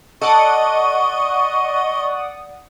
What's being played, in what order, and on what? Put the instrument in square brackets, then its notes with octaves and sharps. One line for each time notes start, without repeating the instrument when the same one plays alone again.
[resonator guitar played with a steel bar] A4 [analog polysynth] D5 F#5 D#6 [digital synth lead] D#5 [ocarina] C#6